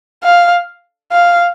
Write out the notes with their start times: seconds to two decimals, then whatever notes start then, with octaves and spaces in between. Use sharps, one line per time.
0.24 F5
1.12 F5